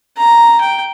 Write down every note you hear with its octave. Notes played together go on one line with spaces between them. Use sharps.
A#5
G5